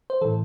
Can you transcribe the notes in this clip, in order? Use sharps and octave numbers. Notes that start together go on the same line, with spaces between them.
C5
A2 E3 A4